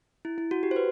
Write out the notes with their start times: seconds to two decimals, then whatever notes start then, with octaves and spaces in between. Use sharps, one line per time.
0.25 E4
0.38 E4
0.51 F#4
0.63 G4
0.71 C5
0.76 B4